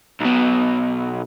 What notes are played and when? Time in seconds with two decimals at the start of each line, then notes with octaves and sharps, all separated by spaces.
0.20 B1 B2